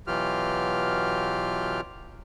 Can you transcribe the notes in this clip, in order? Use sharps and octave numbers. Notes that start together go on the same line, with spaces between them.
B2 E3 F#3 F4 G4 F6